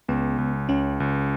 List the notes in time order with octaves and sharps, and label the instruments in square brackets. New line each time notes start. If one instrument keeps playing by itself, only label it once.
[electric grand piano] C#2 [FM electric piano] B3
[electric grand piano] C#2
[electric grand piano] C#2 [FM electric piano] C#4
[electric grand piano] C#2